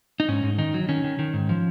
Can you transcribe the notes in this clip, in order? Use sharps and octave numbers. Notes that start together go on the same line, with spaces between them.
D#4
G#2 C#4
G#2
D#3 D#4
F#3
D#3 C#4
D#3
D#3
G#2
F3